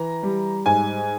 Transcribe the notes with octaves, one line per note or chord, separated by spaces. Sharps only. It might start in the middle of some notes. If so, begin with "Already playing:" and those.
Already playing: E3 A#5
G3
G#2 G#5